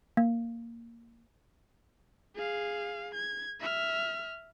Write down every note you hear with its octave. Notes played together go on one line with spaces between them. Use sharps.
A#3
G#4 F5
G#6
E5 F6